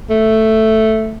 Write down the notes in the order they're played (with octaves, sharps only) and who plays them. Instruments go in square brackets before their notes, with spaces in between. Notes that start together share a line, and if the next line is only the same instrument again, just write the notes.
[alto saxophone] A3